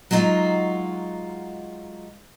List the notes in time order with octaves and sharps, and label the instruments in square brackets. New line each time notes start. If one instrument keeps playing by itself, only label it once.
[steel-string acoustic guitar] F#3 G#3 D#4 F4 F#4